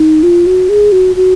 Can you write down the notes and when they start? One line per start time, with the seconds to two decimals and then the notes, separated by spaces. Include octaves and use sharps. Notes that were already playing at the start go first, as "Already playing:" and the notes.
Already playing: D#4
0.23 F4
0.46 F#4
0.69 G#4
0.92 F#4
1.16 F#4